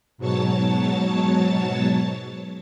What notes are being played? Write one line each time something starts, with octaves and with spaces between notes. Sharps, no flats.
G#2 B2 F#3 C#5 A5 A6